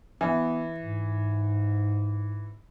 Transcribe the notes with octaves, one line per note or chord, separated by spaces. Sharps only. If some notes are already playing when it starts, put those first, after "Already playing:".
E3 B3
G#2